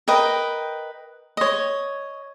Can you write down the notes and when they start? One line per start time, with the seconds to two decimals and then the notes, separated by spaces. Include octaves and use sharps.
0.08 A#4 B4 D#5 G5
1.37 C#5 D#5